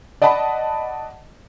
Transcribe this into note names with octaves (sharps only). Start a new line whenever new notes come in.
D5 D#5 F#5 A5 B5